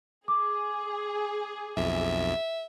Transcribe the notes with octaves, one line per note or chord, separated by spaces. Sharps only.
G#4 D6
B1 F2 E5